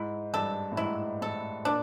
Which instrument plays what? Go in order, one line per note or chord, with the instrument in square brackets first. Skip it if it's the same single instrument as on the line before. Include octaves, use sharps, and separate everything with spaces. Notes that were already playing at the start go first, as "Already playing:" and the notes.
Already playing: [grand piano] G#2 [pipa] E4
[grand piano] G2 [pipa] A4
[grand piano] A2
[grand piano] G#2 [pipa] E4
[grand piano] A2 [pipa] A4
[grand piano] A#2 [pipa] D4